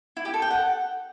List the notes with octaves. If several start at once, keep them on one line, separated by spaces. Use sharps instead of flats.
E4
G4
A4
G5
F#5